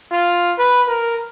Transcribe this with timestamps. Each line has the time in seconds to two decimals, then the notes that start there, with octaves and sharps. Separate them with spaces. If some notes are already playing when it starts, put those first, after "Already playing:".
0.11 F4
0.58 B4
0.88 A#4